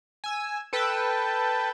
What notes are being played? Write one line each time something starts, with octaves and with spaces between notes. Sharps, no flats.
G#5 E6
A4 B4 G5 A5